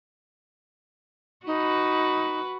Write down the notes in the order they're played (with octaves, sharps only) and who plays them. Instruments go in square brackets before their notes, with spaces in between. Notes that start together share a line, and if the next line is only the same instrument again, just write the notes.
[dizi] D#4 [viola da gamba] F#4 B4